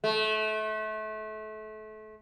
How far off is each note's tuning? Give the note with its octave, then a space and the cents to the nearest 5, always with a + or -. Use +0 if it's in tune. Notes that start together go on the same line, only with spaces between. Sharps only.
A3 -30